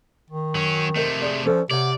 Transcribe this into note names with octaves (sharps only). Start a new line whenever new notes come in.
D#3
F#3 C#4
C3 A3 A#4 C5 D#5
G#4 C5 D5
F3 C#4 A4 D5
C3 C#5 D5 F#5